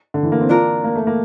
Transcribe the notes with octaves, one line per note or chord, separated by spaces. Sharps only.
D3
E3
A#3
C4
D4 F4 A#4
A#3
A3
A#3